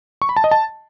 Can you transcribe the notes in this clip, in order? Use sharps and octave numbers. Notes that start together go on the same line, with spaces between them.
C#6
B5
A5
D#5
A5